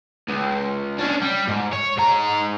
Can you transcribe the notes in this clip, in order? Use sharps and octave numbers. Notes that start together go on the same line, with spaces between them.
C#2
C#4 D4
G3
G#2
C#5
G#2 A#5